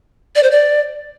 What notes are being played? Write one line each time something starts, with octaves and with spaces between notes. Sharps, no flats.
D5
C5
D5